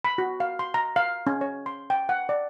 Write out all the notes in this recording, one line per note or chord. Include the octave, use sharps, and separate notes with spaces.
B5
F#4
F5
C6
A#5
F5
C#4
C#5
C6
G5
F#5
D5